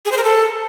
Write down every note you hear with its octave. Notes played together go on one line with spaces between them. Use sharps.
G#4
C5
A#4
A4